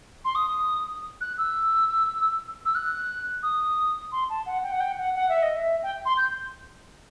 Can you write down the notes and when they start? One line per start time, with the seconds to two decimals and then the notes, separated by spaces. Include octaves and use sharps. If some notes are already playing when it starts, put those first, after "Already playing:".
0.25 C6
0.35 D#6
1.21 F#6
1.38 E6
2.65 E6
2.75 F#6
3.43 D#6
4.12 C6
4.30 A5
4.46 F#5
4.63 G5
4.72 F#5
4.80 G5
4.98 F#5
5.15 F#5
5.29 E5
5.43 D#5
5.57 E5
5.83 G5
6.06 C6
6.17 G6